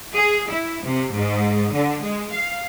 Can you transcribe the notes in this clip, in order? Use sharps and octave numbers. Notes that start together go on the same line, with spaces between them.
G#4
E4
C3
G#2
D3
G#3
F5